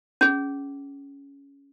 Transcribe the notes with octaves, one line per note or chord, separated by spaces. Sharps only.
C#4 G#4